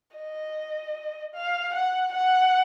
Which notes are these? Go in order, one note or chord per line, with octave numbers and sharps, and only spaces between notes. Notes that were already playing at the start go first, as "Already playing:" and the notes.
D#5
F5
F#5
F#5